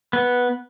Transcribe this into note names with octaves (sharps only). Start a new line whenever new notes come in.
B3